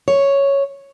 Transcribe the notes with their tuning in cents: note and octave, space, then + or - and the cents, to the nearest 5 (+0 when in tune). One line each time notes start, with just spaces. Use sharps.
C#5 +0